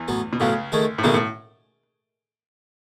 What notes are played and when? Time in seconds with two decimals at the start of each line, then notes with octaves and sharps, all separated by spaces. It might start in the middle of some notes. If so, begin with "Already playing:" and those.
Already playing: E2 E3
0.08 A2 F#3 B3
0.33 B2
0.40 C#2 A2 C#3 F#3 B3
0.72 D#3 A3 C#4 G#4
0.98 A2
1.03 B1 B2 D#3 A3 C#4 G#4
1.14 A2